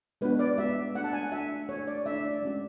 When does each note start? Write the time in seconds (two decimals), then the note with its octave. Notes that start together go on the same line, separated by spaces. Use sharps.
0.21 G#3 B3 D4 F#4 B4
0.39 D5
0.58 G#3 B3 D4 F#4 E5
0.95 A3 D4 F#4 F#5
1.04 A5
1.13 G#5
1.23 F#5
1.32 A3 D4 F#4 E5
1.69 A3 D4 F#4 C#5
1.87 D5
2.06 A3 D4 F#4 E5
2.19 D5
2.30 D5
2.43 G#3 C#4 F#4